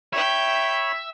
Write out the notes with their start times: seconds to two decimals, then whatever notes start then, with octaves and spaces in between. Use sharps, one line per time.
0.13 C#5 E5 G5 B5 G6